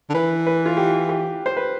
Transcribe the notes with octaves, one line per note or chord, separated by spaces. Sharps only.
D3
E3 B4
B4
F4
G4
G4
C5
B4